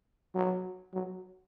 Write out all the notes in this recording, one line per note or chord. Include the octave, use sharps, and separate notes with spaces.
F#3
F#3